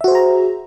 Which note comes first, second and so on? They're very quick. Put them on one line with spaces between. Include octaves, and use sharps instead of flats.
E5 F#4 C5 G#4 A#5